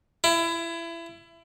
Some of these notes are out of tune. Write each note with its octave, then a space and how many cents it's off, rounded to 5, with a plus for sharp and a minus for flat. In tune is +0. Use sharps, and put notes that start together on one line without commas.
E4 +25